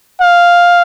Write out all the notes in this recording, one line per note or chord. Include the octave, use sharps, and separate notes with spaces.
F5